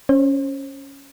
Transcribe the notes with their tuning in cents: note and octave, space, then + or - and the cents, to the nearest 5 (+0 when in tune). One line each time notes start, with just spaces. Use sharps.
C#4 +0 C5 +35